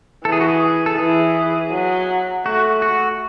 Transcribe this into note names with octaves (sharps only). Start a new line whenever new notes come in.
E3 A4
G#4
F#4
G#4
A4
E3 G#4
F#3
A3 F#4
F#4